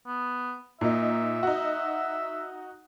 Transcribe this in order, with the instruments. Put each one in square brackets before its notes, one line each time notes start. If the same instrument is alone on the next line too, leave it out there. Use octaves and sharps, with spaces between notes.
[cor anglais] B3
[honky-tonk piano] A#2 D#4 [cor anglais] E5
[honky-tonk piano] D#4 F#4